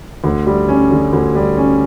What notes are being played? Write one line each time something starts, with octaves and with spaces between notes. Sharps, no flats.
D2
G3
C#4
D3
D2
G3
C#4